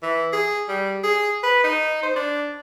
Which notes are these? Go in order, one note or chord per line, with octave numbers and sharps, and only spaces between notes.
E3
G#4
G3
G#4
B4
D#4
C5
D4